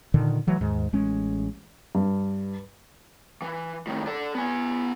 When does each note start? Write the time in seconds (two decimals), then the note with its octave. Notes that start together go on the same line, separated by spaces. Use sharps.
0.14 A#2 D3 D#3
0.47 E3 F#3 A3
0.61 D#2 G#2
0.93 A1 G#3 C#4
1.95 G2
3.42 E3
3.87 A2 D#3
4.07 A4 D5
4.35 B3 G#5